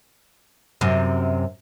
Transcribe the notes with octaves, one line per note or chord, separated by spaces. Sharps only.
F#2 C3